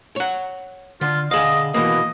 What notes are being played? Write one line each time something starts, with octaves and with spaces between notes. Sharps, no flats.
C#5 F#5
D3 F4
D3 G#4 D#5 F5
B2 E3 A#3 D#5